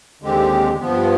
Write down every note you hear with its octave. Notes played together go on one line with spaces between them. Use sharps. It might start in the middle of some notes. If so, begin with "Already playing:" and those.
D#2 D3 G#3 C4 G4
G2 F3 B3